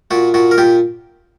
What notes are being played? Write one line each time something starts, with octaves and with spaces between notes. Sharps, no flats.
A#2 F#4
A#2 F#4
A#4
A#2 G4